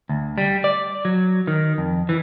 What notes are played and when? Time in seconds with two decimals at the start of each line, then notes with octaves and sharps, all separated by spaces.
0.09 D2
0.38 G3
0.64 D5
1.05 F#3
1.47 D#3
1.78 F2
2.09 E3